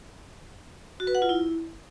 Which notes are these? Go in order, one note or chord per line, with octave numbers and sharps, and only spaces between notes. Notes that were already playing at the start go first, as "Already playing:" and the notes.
F#4
B4
F#5
F4
E4